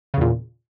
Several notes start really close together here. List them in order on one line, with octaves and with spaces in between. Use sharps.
C#3 E2 A#2